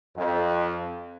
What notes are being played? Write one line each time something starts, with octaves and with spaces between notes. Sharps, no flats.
F2